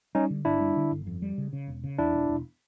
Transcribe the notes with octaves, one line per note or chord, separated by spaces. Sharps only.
G3 C#4 D#4
D3
G1 D4 E4
G3
D3
G1
F2
G3
C#3
C#3
E1
C#3
E2 D4 E4
E1
E1